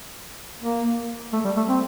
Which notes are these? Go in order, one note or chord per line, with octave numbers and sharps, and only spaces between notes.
A#3
A3
G3
A3
C4